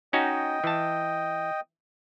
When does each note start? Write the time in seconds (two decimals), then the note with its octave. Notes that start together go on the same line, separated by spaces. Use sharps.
0.13 C#4 D#4 F#4 D#5 G5
0.64 E3 A5